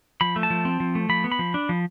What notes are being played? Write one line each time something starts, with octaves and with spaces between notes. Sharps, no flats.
F3 B5
A3
A5
F3
C4
F3
A3
F3 B5
B3
B5
F3
D4
F3